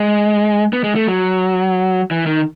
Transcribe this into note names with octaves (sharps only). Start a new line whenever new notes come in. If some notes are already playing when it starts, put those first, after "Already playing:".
Already playing: G#3
B3
G#3
A3
F#3
E3
D#3